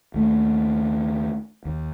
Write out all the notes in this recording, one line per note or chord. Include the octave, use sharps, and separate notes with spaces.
D#2 A3
D#2